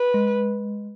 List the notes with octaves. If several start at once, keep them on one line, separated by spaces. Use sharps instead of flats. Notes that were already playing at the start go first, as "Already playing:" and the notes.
Already playing: B4
G#3